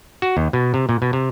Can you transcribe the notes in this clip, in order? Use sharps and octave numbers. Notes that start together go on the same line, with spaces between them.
F#4
D#2
B2
C3
A#2
B2
C3